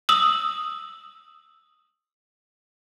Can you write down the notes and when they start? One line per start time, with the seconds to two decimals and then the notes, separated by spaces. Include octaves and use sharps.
0.09 D#6 E6 F#7